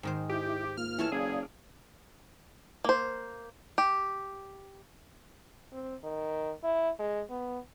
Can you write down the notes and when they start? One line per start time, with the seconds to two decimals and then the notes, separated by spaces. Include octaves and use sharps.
0.03 G#2 D#3 C5
0.29 E4 G4
0.77 A#3 F4 F6
0.99 E3 A4 C#5 A5
1.12 F#1 G#4 D5 F5
2.84 A#3 C5
3.78 G4
5.73 C4
6.04 D#3
6.63 E4
6.99 G#3
7.30 B3